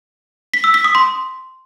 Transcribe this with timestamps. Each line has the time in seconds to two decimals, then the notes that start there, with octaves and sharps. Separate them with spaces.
0.54 B6
0.64 E6
0.74 B6
0.84 D#6
0.95 C6